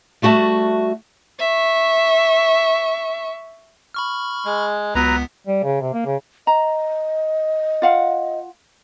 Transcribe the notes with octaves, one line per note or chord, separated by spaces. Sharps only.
G3 A3 F#4 E5 A5
E5 C#6
B5 C#6 F6
G#3
C#2 F#3 B3 B4 A#5 B6
G3
C#3
C3
A#3
C#3
D#5 A#5
F4 F5 F#5